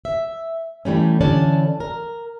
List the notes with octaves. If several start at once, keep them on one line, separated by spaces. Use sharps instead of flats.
E5
E3 G3 A3 C#4
D3 E3 C#4 D4 D5 A5
A#4